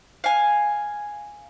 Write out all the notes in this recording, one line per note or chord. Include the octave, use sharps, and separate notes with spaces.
F5 G#5